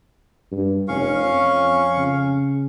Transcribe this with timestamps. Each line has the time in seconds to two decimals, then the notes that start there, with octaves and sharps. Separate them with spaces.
0.52 G2
0.88 F1 C#4 F5 C#6
1.22 F2
1.96 C#3